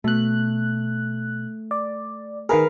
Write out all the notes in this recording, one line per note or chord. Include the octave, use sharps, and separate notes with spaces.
B2 A3 F#6
D5
D#3 G#4 A#4 B4 F5